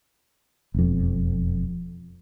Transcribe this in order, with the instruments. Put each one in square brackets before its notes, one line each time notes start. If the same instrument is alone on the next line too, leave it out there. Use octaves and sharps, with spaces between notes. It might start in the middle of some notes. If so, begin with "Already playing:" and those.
[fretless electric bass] E1 F2